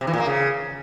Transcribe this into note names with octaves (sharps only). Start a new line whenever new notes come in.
C3
E3
A#2
A#3
C#3